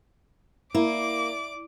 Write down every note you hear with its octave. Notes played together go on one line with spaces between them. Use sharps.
A#3 E4 D5 D6